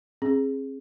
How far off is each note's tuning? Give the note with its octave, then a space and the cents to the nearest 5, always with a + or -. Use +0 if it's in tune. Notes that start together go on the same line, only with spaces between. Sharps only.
C4 +45 G#4 +0